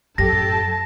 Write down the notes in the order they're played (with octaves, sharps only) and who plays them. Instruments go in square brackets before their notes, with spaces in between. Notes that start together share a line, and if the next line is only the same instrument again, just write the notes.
[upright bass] F#2 A2 [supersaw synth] G4 A4 [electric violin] A5 [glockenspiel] A#6